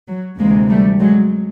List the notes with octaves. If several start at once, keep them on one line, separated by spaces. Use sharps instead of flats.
F#3
D2 C3 E3 G#3 A#3
G3 A3
F#3 G#3